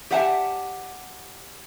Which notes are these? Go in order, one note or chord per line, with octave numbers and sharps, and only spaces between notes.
G4 D5 E5 F#5 G#5 A5